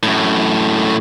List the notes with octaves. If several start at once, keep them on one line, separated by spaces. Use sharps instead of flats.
F#2 A2